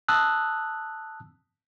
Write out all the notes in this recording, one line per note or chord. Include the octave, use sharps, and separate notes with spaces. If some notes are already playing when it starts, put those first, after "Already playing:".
A5 D#6 E6 F#6